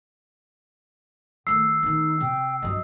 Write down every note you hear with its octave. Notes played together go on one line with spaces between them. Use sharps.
D#3 A3 E6 C7
D#3 B3 D#4
C3 G5
G2 F#3 D#5